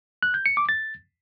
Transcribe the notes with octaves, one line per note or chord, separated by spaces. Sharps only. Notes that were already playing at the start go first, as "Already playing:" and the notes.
F#6
G6
C#7
D6
A6